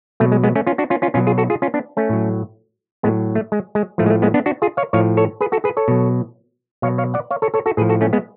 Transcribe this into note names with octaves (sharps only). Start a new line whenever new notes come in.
B2 F#3 A3
G#3
G#3 B3
A3 C#4
C#4 F4
D4 F#4
C#4 F4
C#4 F4
B2 F#3 C#4 F4
F4 G#4
F#4 A4
F4 G#4
C#4 F4
B3 D4
A3 C#4
A2 F#3
A2 F#3 G#3 B3
A3
G#3
G#3
A2 F3 A3
G#3
A3
G#3 B3
B3 D4
D4 F#4
F4 G#4
C#5 F5
A2 F3 C#5 F5
A4 C#5
G#4 B4
F#4 A4
G#4 B4
A4 C#5
B2 F#3
B2 F#3 C#5 F5
C#5 F5
D5 F#5
C#5 F5
A4 C#5
A4 C#5
F#4 A4
A2 F3 G#4 B4
F#4 A4
A3 C#4
G#3 B3